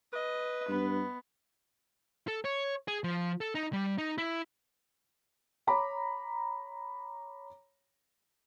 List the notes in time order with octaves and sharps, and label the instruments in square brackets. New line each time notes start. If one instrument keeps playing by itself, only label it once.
[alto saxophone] B4 [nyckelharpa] D#5
[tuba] G2 [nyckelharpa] B3
[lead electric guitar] A4
C#5
G#4
F3
A4
D#4
G3
D#4
E4
[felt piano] C#5 A#5 B5 D6